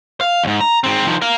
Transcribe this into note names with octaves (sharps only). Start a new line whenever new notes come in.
F5
D#2 G#2
A#5
G#2 C4
D#3 F3
A#4 F5